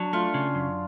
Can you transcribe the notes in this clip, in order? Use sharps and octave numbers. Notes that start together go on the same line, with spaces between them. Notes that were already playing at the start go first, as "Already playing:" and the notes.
Already playing: F#3 D4
A3 F4
C#3
F#2